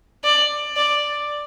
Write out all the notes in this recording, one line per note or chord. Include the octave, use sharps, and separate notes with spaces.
D5
D5